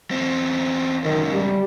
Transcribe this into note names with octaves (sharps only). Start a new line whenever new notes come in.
E2 C4
C#2 F#2 D#3
G3